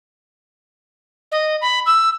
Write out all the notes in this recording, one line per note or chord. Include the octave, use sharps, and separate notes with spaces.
D#5
B5
E6